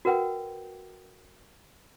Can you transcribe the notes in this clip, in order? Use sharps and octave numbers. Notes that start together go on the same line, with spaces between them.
F#4 A#4 B4 F#5 G5